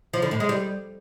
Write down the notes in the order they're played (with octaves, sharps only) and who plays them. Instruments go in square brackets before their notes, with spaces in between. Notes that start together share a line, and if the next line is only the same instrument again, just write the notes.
[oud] F3
D3
A2
G#3
G3